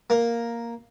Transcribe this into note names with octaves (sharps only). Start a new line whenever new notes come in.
A#3